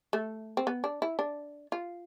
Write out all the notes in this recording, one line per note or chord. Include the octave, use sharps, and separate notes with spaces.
A3
C4
B3
D4
E4
D4
F4